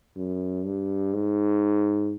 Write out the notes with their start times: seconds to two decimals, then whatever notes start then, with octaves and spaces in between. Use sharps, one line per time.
0.16 F#2
0.65 G2
1.14 G#2